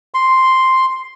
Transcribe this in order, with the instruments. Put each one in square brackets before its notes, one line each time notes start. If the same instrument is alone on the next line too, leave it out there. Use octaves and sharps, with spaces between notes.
[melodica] C6